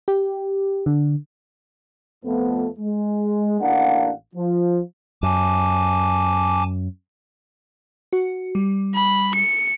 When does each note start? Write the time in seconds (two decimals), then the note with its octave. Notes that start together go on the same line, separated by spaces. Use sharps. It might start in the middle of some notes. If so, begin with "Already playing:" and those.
0.08 G4
0.86 D3
2.25 F2 F3 A3 B3
2.79 G#3
3.61 A1 A#3 D4 F5 F#5
4.35 F3
5.23 F#2 G#5 A5 D6
8.13 F#4
8.55 G3
8.95 B5
9.35 C#7